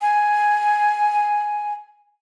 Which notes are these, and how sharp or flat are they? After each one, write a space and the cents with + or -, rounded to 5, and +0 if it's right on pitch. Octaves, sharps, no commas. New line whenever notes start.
G#5 +5